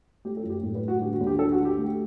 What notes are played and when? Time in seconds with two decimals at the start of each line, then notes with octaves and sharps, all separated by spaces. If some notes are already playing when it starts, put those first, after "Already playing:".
0.25 A3 G4
0.37 A4
0.43 F#2
0.50 G4
0.63 A2
0.75 B4
0.82 G3
0.88 F#4
1.01 D3 G4
1.13 F#4
1.21 D2
1.27 G4
1.39 D3 A4
1.52 F#4
1.58 D3
1.65 G4
1.78 A3